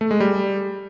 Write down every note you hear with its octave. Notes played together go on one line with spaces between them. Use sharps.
A3
G#3
G3